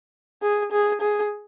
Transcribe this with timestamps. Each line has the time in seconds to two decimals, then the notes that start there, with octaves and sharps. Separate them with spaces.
0.42 G#4
0.72 G#4
1.01 G#4